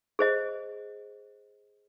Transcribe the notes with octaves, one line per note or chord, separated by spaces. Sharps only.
G#4 C5 D#5